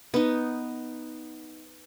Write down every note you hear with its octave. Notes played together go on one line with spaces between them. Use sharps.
B3 D#4